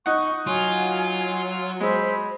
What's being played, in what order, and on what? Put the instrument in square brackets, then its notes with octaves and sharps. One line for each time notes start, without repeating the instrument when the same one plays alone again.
[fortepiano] D#4 F#5 [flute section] C#6
[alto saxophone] F#3 [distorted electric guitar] F4 [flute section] G#5
[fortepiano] G#3 [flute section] C5 B5 E6